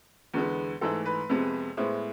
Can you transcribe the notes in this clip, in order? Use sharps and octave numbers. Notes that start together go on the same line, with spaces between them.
E2 D3 G#3 B3
G#2 E3 A3 A4
B4
F2 C3 G#3 B3
A2 G#3 B3 C5